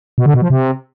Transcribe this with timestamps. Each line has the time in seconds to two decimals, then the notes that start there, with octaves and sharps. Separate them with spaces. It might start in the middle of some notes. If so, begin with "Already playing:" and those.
0.18 B2
0.26 D3
0.34 B2
0.42 F3
0.50 C3